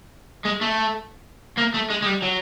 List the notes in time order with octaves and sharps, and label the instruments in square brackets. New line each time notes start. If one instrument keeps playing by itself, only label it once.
[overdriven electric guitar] G#3
A3
A#3
A3
G#3
G#3
G3
F#3